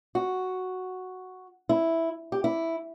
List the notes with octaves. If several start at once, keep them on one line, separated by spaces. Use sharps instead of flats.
F#4
E4
G4
E4